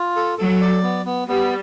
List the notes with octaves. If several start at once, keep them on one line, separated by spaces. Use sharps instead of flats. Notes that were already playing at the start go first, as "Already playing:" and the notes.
Already playing: F4
A4
F#3 A4
D5
B3
B3
G3 B3